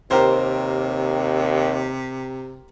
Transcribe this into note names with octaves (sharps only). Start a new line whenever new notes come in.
D#2 C3 G4 A#4 C5